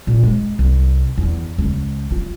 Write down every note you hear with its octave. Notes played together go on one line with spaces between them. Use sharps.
A#2
G#3
C2
E2
C#2
F4